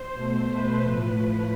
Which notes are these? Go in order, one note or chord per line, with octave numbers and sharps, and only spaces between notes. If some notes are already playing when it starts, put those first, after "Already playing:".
Already playing: C5
B2 A3
B4
A2 F3 A3